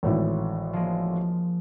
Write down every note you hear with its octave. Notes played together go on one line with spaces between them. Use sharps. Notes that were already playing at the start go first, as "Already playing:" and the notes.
G#1 A2 E3
F3 G#3 A#3